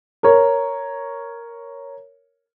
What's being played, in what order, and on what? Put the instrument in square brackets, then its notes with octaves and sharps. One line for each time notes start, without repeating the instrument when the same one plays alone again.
[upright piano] A#4 C#5